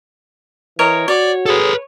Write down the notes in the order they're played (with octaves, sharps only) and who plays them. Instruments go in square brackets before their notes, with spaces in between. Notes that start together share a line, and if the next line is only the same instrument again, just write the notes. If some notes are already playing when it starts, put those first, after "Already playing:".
[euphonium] E3 [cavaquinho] A#4 C#5 D#5
[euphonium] F#4 [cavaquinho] C#5 [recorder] D5
[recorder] G#4 [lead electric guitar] A4 B4